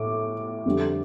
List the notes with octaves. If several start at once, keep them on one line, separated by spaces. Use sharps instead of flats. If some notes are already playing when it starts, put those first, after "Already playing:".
Already playing: A2 D6
F2 D3 G3